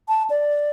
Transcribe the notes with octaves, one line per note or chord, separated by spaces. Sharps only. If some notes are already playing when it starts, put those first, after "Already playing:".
A5
D5